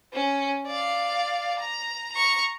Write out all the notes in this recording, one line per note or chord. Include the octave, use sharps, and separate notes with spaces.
C#4
D5 F5
A#5
A#5 C#6